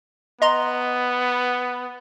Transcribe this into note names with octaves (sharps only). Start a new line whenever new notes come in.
B3 D#5 A#5 C6